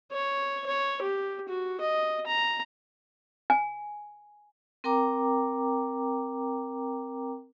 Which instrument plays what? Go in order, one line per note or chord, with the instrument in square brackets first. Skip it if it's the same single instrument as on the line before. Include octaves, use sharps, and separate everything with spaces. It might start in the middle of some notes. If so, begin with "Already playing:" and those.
[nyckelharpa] C#5
C#5
G4
F#4
D#5
A#5
[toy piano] G#5
[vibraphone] C4 A#4 G5 A#5 D6